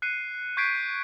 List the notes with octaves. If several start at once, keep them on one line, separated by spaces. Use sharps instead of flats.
F#6 C7 C#7 D#7
C#6 G6 G#6 B6 C7 D7